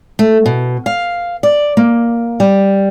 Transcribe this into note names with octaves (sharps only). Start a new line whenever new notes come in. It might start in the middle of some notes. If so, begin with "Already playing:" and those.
A3
B2
F5
D5
A#3
G3